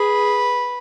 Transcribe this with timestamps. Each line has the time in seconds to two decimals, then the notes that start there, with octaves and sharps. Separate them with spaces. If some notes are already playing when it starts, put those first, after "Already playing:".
Already playing: G#4 B4